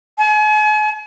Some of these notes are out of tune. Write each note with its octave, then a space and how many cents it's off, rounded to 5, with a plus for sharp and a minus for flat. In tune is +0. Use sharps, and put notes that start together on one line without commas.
G#5 +40